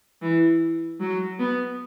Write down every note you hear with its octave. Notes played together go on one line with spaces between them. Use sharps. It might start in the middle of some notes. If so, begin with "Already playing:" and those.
E3
F#3
B3